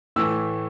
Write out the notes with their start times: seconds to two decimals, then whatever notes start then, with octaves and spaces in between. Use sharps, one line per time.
0.16 A2 E3 A3 E6